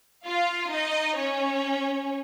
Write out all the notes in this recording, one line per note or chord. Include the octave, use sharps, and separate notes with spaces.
F4 F5
D#4 D#5
C#4 C#5